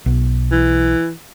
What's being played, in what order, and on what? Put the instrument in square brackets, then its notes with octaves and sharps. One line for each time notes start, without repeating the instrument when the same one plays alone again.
[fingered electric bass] B1
[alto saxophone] E3